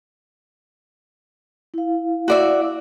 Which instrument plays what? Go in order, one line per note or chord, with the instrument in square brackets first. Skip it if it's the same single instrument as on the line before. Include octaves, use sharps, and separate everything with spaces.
[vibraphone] E4 F5
[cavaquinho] F#4 D5 E5